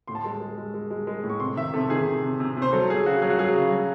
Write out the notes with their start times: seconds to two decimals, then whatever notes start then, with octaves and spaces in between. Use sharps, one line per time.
0.07 A2 C6
0.15 A5
0.23 G#3 C6
0.40 G#3
0.57 G#3
0.74 G#3
0.90 G#3
1.07 G#3
1.24 A2
1.30 C#6
1.40 C3 C6
1.56 D#3 E5
1.73 C3 A4
1.90 D#3 G#4
2.07 C3
2.23 C3
2.40 C3
2.57 C3
2.62 C5
2.73 F#3 A4
2.90 F#3 G#4
3.06 C#3 F#4
3.22 F#3 G#4
3.30 F#4
3.39 F#3 G#4
3.55 C#3
3.72 F#3